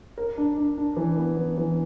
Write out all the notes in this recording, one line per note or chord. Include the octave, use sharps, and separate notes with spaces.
A#4
D4
D4
D4
E3
B3
E3
E3